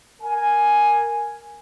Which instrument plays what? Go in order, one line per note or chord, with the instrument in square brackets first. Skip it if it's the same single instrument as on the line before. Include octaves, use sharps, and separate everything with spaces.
[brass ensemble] A#4 G#5